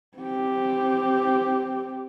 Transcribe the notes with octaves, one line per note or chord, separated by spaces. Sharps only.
C4 G4